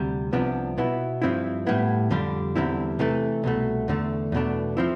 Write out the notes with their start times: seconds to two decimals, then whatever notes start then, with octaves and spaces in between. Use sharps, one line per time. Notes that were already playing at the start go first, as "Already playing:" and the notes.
Already playing: D2 C3 G3
0.33 C2 C3 F3 B3 D4
0.78 B2 B3 E4
1.22 G2 F3 C4 E4
1.67 A2 G3 B3 E4
2.10 F2 D3 G3 D4
2.55 E2 D3 G3 C4 E4
2.99 C3 E3 A3
3.44 C2 B2 A3
3.88 E2 D3 A3
4.32 E2 B2 A3 D4
4.77 F3 C4 E4